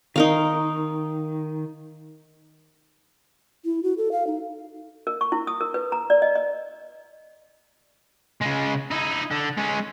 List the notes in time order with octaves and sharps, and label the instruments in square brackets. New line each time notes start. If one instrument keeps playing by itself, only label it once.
[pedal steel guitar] D#3 [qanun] D#4 A#4 F5
[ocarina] E4
F#4
A4
F5
D#4
[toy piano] A#4
C#6
E4
D#6
A#4
B4
A#5
D5
D#5
D#5
[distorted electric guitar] C#3 G#3
D#4 E4
D3
G#3 C#4